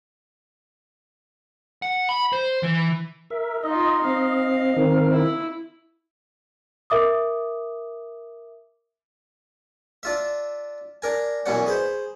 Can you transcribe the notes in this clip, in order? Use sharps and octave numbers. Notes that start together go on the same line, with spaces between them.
F#5
B5
C5
E3
A#4 E5
D#4 F4 D#5
C4 D#5 F5
D#3 C4 A#4
E4
A#4 E5 D6 D#6
D4 F4 E5
D4 A#4 G#5
F#2 B2 E3 C#4 D4 F#5
G#4 B4 C5